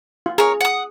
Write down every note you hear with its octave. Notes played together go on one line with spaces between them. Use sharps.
F4
G#4 A#4 C#5
F#5 D#6